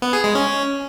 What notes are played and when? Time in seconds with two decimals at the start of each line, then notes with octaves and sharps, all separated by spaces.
0.02 B3
0.13 G#4
0.24 G#3
0.35 C#4